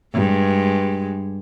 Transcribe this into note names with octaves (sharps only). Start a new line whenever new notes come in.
G2 G#3